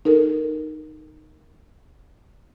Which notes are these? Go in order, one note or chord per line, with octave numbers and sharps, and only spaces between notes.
D#4 A4 A#4